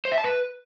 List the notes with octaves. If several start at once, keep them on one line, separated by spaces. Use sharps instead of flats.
C5
E5
A5
B4